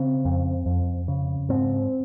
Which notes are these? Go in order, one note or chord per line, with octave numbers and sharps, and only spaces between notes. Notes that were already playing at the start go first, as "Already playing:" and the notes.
Already playing: C#3 C4
F2
F2
C#3
G#2 C4